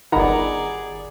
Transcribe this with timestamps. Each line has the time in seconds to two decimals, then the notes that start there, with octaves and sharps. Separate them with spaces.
0.12 G1 D#3 G#4 D5 F#5 A#5 B5